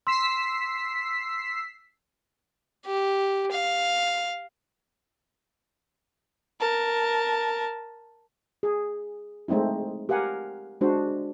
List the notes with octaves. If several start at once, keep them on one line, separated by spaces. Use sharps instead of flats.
C6 E6 B6 C7
G4
F5
A#4 A5
G#4
G#3 A3 C4 D#4 E4
G4 A#4 F5 F#5 G#5
G#3 D4 F#4 C5